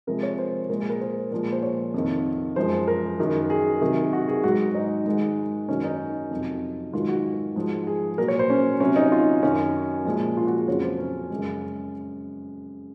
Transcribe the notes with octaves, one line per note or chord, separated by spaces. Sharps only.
C3 F3 G#3 A#4
C#5
C5
A#2 G#3 A#4
G#4
A#4
C5
A#2 F3 G#3
C5
C#5
F2 C3 D#3
F#2 F3 G#3 C5
A#4
F#2 D#3 F#3
G#4
C3 D#3 F#3
F#4
G#4
G#2 F#3 F#4
D#4
G#2 D#3 G#3
F#2 D#3 F#3 C#4
D#4
F2 C3 F#3
G#2 D#3 F#3 F4
F#4
G#2 F3 G#3
G#4
A#2 F#3 A#4
C#5
C5
C#4
C3 F#3 C#4
D#4
F4
F#2 D#3 F#3 C#4
A#2 F3 G#3
F4
F#4
G#4
F2 C#3 F#3 C#5
C5
C#4
F#2 C#3 G#3